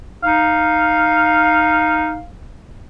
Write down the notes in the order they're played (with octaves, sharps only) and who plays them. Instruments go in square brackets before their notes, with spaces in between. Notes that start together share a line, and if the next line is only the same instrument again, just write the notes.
[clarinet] D#4 [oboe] F5